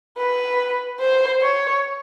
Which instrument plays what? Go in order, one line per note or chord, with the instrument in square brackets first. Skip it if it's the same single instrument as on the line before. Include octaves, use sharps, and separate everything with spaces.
[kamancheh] B4
C5
C#5